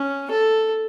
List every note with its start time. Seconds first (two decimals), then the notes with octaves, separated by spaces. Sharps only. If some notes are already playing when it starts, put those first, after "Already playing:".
Already playing: C#4
0.31 A4